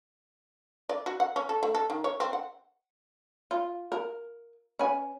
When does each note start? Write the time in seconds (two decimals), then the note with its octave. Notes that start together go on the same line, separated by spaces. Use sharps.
0.89 D5
1.06 F#4
1.20 F#5
1.36 C#4
1.49 A4
1.63 A3
1.75 A4
1.90 D#3
2.04 C#5
2.20 C4
2.33 F#5
3.51 F4
3.92 A#4
4.79 C#4 B4 G#5